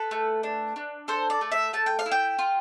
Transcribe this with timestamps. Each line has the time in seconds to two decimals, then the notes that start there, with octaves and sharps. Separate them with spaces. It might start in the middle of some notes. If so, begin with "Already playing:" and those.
Already playing: A4 B4
0.11 A3
0.43 D4
0.76 D4
1.08 A4 C5
1.30 D5
1.41 A3
1.52 E5
1.73 A3 A5
1.86 G5
1.99 F5
2.06 E4
2.11 G5
2.39 F4